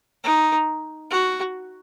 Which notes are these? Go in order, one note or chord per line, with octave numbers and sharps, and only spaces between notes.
D#4
F#4